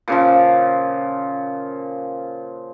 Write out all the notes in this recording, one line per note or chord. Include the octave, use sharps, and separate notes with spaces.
A#2 C#3 F3